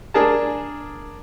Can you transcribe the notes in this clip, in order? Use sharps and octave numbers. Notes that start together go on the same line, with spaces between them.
D4 G#4 A#4 A5